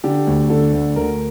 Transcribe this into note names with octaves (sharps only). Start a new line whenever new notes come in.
D3 G4
D2
D3 A4
D2
D2 A#4